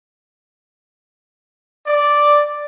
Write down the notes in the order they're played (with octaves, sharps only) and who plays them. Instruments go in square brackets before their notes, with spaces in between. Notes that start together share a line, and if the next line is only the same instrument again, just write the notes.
[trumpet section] D5